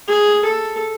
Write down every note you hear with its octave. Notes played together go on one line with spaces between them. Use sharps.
G#4
A4